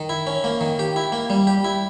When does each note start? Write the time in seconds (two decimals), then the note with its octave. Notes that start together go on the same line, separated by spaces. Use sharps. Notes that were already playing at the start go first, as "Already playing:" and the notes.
Already playing: D#3
0.09 E4
0.27 C#4
0.44 A#3
0.61 D#3
0.79 G4
0.96 E4
1.12 A#3
1.30 G3
1.47 G4
1.64 E4